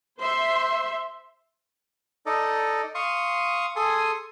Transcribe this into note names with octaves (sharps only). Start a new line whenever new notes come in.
C5 E5 C6
D#4 A4 D5 D#5
F5 C6 C#6 D#6
G#4 A4 G#5 C6 D#6